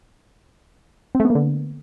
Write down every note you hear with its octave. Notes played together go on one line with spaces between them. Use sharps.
C4
A3
B3
A#3
D3